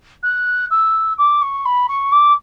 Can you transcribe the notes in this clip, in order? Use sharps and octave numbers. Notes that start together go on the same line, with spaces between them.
F#6
E6
D6
C#6
B5
C#6
D6